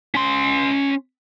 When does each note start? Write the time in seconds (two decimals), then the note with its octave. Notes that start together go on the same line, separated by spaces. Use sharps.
0.15 C#4 C6